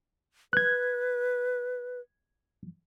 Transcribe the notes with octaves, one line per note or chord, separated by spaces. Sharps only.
B4 F#6 G#6